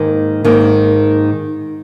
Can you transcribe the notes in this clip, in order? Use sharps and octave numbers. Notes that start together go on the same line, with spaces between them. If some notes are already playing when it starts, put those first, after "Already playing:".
Already playing: G#2 D#3 A#3
G#2 D#3 A#3